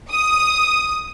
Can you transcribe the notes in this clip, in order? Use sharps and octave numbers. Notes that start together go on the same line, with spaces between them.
D#6